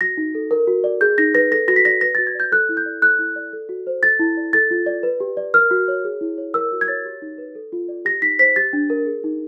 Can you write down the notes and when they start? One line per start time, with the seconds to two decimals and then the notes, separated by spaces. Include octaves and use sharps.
0.01 F#4 A#6
0.17 D#4
0.35 A4
0.51 A#4
0.68 F#4
0.84 D5
1.01 G#4 G6
1.18 D#4 A#6
1.35 B4 A#6
1.52 A4 A#6
1.68 F#4 A#6
1.76 B6
1.85 D5 A#6
2.01 B4 A#6
2.15 A6
2.18 F#4
2.27 G#6
2.35 D5 G6
2.52 A4 F#6
2.69 E4
2.77 G6
2.86 D5
3.02 A4 F#6
3.19 E4
3.36 D5
3.53 A4
3.69 F#4
3.87 C5
4.03 A4 A6
4.20 E4
4.37 D5
4.53 A4 A6
4.71 F4
4.86 D5
5.03 B4
5.20 G4
5.37 D5
5.54 A#4 F6
5.71 F#4
5.88 C#5
6.04 G#4
6.21 E4
6.38 C#5
6.54 A#4 E6
6.72 F#4
6.81 G#6
6.88 C#5 A6
7.05 G4
7.22 D#4
7.38 B4
7.55 A4
7.72 F4
7.89 D5
8.05 G4 A#6
8.22 D#4 B6
8.39 C5 B6
8.56 G4 A6
8.73 D4
8.90 A#4
9.06 G#4
9.24 D#4